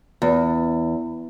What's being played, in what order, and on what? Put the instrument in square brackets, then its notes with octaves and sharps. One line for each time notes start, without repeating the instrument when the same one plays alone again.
[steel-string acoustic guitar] E2